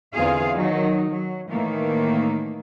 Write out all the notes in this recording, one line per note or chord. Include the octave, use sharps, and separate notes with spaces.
E2 D3 C4 F4 G#4 F5
D#3 F#3 D#4
F#3
A2 D#3 E3 A3 A#3